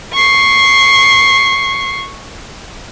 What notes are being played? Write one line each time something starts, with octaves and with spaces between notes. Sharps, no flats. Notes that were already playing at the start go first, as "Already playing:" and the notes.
C#6 C7